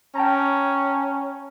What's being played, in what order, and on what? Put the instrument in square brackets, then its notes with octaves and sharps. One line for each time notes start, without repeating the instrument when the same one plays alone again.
[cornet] C#4 [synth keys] G5 A5 A#5